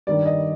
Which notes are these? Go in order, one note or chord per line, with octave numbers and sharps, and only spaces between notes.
G2 D#3 G3 D5
D#5